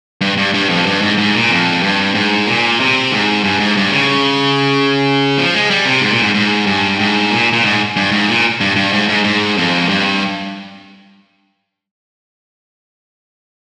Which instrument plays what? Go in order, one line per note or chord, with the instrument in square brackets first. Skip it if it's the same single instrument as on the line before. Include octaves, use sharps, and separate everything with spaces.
[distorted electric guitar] G2
G2
G2
F2
G2
G#2
G#2
A#2
F2
G2
G#2
A#2
C3
G#2
G2
G#2
G2
C#3
F3
G#3
G3
C3
G#2
A#2
G#2
G#2
G2
G#2
A#2
A#2
G#2
G2
G#2
A#2
G2
G2
G#2
G#2
G#2
F2
G2